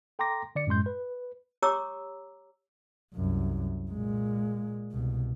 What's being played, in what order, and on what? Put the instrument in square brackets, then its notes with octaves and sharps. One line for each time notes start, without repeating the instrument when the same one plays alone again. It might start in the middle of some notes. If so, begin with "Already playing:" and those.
[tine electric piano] A4 G5 A#5 C6 D6 A#6
D3 D5 C#7
F#2 A2 G#3 C6 G6
B4
[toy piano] G4 C#5 A#5 D6 E6
[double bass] C2 F#2
A#2 G#3
C2 B2